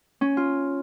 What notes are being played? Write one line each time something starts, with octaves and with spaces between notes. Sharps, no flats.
C#4
F4